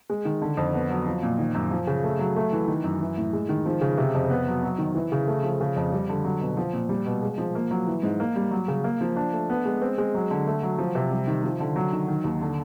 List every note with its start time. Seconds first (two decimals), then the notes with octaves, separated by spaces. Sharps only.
0.10 G#3
0.25 D#3
0.42 D3
0.57 F2
0.74 B3
0.90 F#3
1.07 F3
1.23 A#2
1.39 D#3
1.55 F#2
1.71 F3
1.87 C#3
2.04 A3
2.19 F#3
2.36 A3
2.53 E3
2.68 D#3
2.84 F#2
3.00 E3
3.18 A2
3.33 G#3
3.49 D#3
3.66 F3
3.81 C#3
3.98 C3
4.14 F2
4.30 B3
4.47 F#3
4.63 F#3
4.78 D#3
4.95 E3
5.12 C#3
5.28 A3
5.43 F3
5.61 C#3
5.76 F2
5.93 G3
6.09 D3
6.24 F#3
6.41 B2
6.57 F3
6.73 A#2
6.89 G3
7.06 B2
7.22 G#3
7.38 F3
7.55 A#3
7.71 F#3
7.87 E3
8.03 G#2
8.20 A#3
8.36 G3
8.51 F#3
8.68 C#3
8.84 A#3
9.01 F3
9.16 D4
9.33 A3
9.50 B3
9.65 G#3
9.82 C4
9.98 G#3
10.14 F#3
10.31 D3
10.47 A3
10.63 F#3
10.78 F3
10.95 C3
11.11 G3
11.27 D#3
11.44 F3
11.60 D3
11.76 F#3
11.93 D#3
12.08 D#3
12.24 D#2
12.41 D3